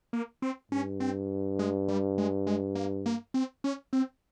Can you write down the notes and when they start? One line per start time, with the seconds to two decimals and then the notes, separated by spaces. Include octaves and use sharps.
0.13 A#3
0.42 C4
0.72 G2 C#4
1.00 C4
1.59 G#3
1.88 G3
2.18 G#3
2.47 G#3
2.75 A#3
3.06 A#3
3.34 C4
3.64 C#4
3.93 C4